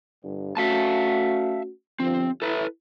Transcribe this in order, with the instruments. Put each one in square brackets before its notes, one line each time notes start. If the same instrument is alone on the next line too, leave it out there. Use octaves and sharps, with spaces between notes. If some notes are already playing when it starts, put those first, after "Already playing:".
[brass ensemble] G1
[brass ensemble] A3 C#4 F#4 [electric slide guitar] E5 F5 A5
[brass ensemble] G1 F3 [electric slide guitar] C4
[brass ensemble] E4 [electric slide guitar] A4 B4